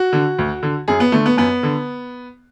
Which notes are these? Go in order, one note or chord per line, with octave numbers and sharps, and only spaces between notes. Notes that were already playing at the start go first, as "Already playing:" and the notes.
Already playing: F#4
D3
D2
D3
F#2 G#4
B3
D3 A3
B3
F#2 B3
D3